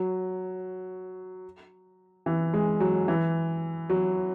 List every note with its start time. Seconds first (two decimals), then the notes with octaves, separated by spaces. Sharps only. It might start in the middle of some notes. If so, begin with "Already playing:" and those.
Already playing: F#3
2.26 E3
2.54 G#3
2.80 F#3
3.08 E3
3.90 F#3